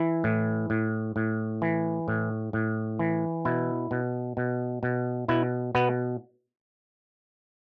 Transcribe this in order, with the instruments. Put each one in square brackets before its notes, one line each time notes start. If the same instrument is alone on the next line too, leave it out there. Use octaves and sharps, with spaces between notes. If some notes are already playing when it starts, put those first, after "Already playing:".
Already playing: [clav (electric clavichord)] E3 E4
A2
A2
A2
E3
A2
A2
E3
B2 E4
B2
B2
B2
B2 E4
B2 B3